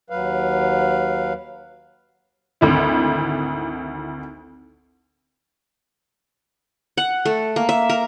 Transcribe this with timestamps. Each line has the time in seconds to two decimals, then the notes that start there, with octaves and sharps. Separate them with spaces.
0.10 D#2 F#3 B4 F5
2.61 G#1 D2 E4
6.97 F#5
7.25 A3
7.56 A#3
7.69 E5
7.90 A#4